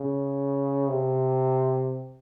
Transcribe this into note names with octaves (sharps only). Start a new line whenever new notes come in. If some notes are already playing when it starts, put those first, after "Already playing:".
Already playing: C#3
C3